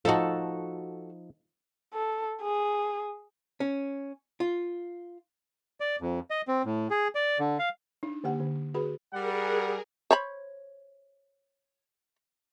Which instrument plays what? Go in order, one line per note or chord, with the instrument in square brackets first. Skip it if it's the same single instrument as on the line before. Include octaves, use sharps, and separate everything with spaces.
[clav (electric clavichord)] F3 D#4 [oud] F#4 A4
[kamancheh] A4
G#4
[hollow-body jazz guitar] C#4
F4
[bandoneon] D5
F2
D#5
C4
A2
G#4
D5
D3
F5
[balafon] D4 D#4
D3 A#3 G4 F#5
D3
F#4 G#4 B4 B5
[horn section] G3 F#5 [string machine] G#4 A#4
[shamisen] C5 C#5 B5